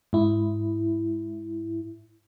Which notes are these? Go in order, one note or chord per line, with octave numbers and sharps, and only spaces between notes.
G#2 E4